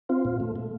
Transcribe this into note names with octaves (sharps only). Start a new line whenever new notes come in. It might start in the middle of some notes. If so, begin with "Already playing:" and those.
C4 F4
A#2
A3
A3